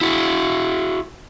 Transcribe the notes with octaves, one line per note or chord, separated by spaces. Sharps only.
E4 F#4